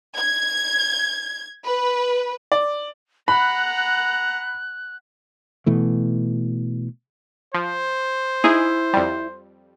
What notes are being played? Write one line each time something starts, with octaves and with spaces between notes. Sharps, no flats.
G#6
B4
D5
F#5 A#5 B5 F#6
B2 E3 A3
F3 C5
D#4 E4 G#4
F2 G3